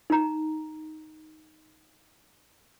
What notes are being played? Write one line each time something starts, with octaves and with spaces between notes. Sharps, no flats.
D#4 A#5